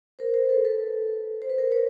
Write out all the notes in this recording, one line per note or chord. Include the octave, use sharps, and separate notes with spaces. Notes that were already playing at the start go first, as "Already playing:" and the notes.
A#4 C5
A#4 C5
A4 B4
A4 B4
C5
B4
A#4 C5
B4 C#5